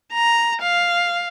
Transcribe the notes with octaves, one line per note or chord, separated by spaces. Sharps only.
A#5
F5